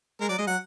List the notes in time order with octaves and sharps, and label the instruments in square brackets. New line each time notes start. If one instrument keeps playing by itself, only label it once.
[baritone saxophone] G#3 [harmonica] A#4
[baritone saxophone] F#3 [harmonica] D5
[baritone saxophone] G#3 [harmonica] D#5
[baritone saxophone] F#3 [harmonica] F#5